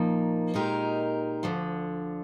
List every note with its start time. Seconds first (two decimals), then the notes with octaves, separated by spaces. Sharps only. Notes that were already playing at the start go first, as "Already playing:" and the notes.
Already playing: A#2 F3 A#3 D#4
0.54 A#2 G#3 D#4 G4 A#4
1.43 D2 D3 F3